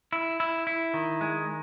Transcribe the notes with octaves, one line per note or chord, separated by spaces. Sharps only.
E4
E4
E4
D#3
G#3